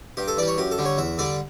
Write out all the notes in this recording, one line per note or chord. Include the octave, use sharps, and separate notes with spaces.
G2 G4
A4
E3 G3 D5
C#5
F#2 G4
A4
D3 G3
C#5
E2 E5
D3 G3 D5